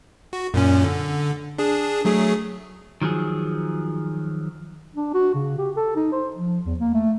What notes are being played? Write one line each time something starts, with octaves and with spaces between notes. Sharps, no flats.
F#4
F#2 A#2 C#4
D3
D4 G#4
F#3 A3 G#4
D#3 F3 F#3 G#4
D4
F#4
C#3
G4
A4
D#4
C5
F3
E2
A#3
A3